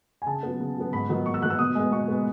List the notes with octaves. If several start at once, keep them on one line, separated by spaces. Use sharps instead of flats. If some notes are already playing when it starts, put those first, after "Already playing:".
G#5
C#3 A5
F#3 B3
C#3
F#3 B3
G#2 B5
D#3 F#3 B3
G#2 C#6
E6
D#3 F#3 B3 F#6
E6
B2 D#6
G#3 B3
B2 C#6
G#3 B3